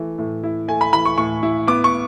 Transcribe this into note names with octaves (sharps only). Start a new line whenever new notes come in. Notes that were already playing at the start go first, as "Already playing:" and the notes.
Already playing: E3 A3
A2
E4
A3 G#5
B5
E3 B5
C#6
A2 C#6
E4
B3 D6
C#6